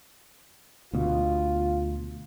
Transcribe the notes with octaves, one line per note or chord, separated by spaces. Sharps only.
D2 B2 F4